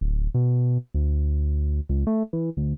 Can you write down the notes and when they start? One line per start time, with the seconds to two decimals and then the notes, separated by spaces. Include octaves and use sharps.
0.01 D1
0.35 B2
0.94 D2
1.89 C#2
2.07 A3
2.33 E3
2.57 D2